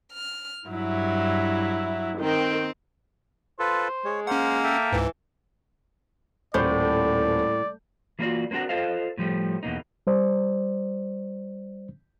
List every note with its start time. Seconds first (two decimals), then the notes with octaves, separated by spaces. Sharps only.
0.13 F6
0.69 G2 F#3 E4
2.19 D#3 C4 G5
3.59 F4 A4 B4 C5
4.05 G#3 C#5
4.27 A#3 C#4 C5 F#5
4.64 A4 E5 G5
4.92 C#2 G#2 E3
6.54 D#1 A2 C5 D5 G6
8.19 E3 A#3 D#4 F4 F#4 D5
8.51 A#3 C4 D4 F#4 A#4
8.69 F4 A4 C5 D#5 F5
9.17 A2 F3 G3 A3
9.63 E2 B2 A#3 D#4
10.07 G3 C5 D5